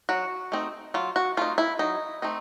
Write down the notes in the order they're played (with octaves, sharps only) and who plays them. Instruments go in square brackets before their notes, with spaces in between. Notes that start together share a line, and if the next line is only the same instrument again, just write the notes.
[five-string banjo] F#3 F#4
A3 C4 D#4
F#3 F4
F#4
A3 C4 D#4 F4
E4
F#3 D#4
A3 C4 D#4